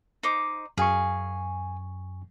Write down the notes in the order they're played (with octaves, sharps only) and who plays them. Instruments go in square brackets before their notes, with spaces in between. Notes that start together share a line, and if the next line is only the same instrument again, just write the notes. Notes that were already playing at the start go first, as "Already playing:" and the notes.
[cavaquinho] D#4 C5 D6
[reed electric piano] F#2 G#5 C#6 [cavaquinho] G#4 F5